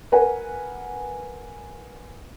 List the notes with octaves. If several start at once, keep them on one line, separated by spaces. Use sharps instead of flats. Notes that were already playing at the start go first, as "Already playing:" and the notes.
A#4 B4 F#5 G#5